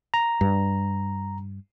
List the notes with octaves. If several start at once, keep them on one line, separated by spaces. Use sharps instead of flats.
A#5
G2